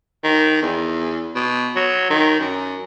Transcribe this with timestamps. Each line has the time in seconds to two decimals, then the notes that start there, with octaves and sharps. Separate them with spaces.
0.24 D#3
0.62 E2
1.35 B2
1.76 F#3
2.10 D#3
2.39 F#2